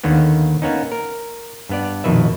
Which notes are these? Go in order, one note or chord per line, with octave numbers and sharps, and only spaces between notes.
D#2 D3 D#3 A#3 B3
A#3 B3 C#4 D#4
A#4
G2 B3 D5
A#1 F2 B2 D#3 B4 E5